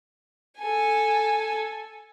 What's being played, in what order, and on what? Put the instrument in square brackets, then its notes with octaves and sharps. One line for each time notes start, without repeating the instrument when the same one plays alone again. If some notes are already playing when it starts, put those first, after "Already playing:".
[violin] A4 G#5